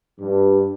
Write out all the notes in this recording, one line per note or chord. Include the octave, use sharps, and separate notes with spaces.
G2